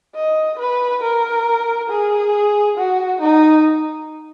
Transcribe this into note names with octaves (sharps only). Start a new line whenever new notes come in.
D#5
B4
A#4
G#4
F#4
D#4